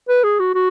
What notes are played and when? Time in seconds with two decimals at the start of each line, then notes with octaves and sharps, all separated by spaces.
0.09 B4
0.24 G#4
0.40 F#4
0.55 F#4